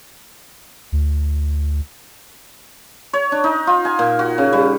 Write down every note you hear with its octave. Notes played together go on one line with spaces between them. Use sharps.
D2
C#5
D4
D#4
F4
G#5
A#2
F#4
C#3
G3